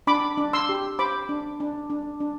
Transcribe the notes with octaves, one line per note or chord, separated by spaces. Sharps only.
D4 B5 D6
D4
C6 E6
G4
C5 B5 D6
D4
D4
D4
D4